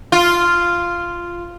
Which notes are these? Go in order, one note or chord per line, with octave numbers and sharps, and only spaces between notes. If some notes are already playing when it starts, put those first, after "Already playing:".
F4